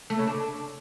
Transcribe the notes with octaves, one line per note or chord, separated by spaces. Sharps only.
A3
C#3
D4